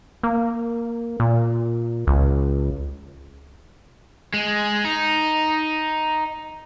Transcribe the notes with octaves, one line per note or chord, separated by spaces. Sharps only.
A#3
A#2
C#2
G#3
D#4